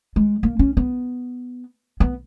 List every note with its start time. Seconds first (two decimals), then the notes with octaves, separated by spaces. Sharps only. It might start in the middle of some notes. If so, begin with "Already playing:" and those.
0.16 G#3
0.43 A#3
0.59 C#4
0.77 B3
2.00 B3